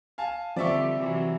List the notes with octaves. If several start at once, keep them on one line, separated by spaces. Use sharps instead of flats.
F5 G#5 A5
D3 F3 G3 C4 G4 D5 E5 C#6
C3 E3 F#3